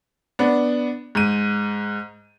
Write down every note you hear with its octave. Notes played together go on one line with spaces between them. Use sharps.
B3 D4
G#2 D#7